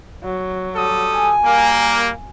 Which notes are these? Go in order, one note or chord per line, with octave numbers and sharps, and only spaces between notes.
F#3
G3 A4 D#6
G#5
G3 A#3